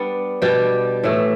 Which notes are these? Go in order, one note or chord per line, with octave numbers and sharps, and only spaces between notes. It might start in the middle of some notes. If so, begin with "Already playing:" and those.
Already playing: G3 B3 D4
B2 G3 D4 G4
A2 E3 A3